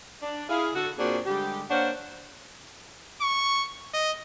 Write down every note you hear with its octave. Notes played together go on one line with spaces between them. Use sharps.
D4
E4 G#4 F5
D3 F#4 A4
A#2 A#3 C4 D4 F#4 G#4
D3 G3 G#3 G4
A#3 D4 C5 C#5 F#5
C#6
D#5